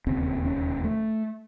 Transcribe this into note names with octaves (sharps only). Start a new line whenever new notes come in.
E1 D#2 C#3 C4
C#4
A3